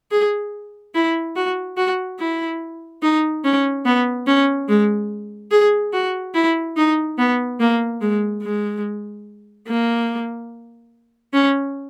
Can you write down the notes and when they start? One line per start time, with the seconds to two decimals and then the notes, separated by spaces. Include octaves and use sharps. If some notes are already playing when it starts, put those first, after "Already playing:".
0.11 G#4
0.95 E4
1.36 F#4
1.77 F#4
2.20 E4
3.02 D#4
3.44 C#4
3.85 B3
4.27 C#4
4.68 G#3
5.51 G#4
5.93 F#4
6.34 E4
6.76 D#4
7.18 B3
7.60 A#3
8.01 G#3
8.43 G#3
9.68 A#3
11.34 C#4